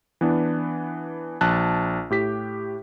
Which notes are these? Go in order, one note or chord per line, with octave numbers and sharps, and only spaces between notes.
E3 B3 D4
A#1 A5 F#6
A2 G4 B6